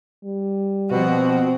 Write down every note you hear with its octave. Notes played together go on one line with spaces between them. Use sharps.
G3
B2 F3 C4 F#4